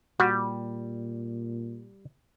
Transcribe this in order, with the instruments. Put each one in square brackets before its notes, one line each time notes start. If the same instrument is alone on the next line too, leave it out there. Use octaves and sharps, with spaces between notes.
[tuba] A#2 [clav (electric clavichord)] G3 [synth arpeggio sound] F#4